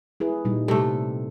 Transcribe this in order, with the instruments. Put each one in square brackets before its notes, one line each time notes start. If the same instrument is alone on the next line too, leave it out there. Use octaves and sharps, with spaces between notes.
[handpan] E4 G#4 B4
A#2 G3 D#4
[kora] C3 A3 [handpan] G3 A4